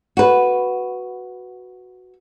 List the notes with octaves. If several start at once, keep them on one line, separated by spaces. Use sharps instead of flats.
F#4 B4